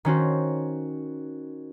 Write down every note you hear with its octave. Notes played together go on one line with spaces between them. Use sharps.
D#3 C#4 F#4 C5